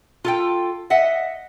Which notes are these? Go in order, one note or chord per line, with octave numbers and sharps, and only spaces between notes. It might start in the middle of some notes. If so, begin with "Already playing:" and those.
F4 A4 G5
D#5 E5 F#5